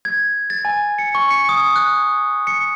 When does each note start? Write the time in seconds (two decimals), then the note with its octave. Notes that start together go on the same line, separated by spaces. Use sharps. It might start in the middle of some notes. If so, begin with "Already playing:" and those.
0.05 G#6
0.50 A6
0.65 G#5
0.98 C#7
1.15 C#6
1.31 C#7
1.49 D#6
1.76 F#6
2.47 C#7